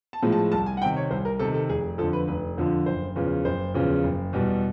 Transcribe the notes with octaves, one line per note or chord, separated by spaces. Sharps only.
A5
A2 F3 G#3
A5
C2 A5
G#5
F#5
C3 D#3 G5
C#5
C2 C5
A#4
C3 D#3 A4
A4
F1 G#4
F2 D3 F3 A4
B4
F1 B4
F2 D3 F3
F#1 C5
E2 C#3 F3
F#1 C5
E2 C#3 F3
F#1
E2 B2 G3